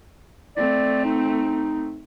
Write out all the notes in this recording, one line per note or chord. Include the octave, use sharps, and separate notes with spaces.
A3 C4 D5
D#4